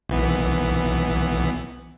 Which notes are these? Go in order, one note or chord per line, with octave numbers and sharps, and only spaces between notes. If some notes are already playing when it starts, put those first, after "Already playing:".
B1 E3 B3